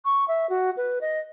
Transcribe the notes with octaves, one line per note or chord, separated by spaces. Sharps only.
C#6
E5
F#4
B4
D#5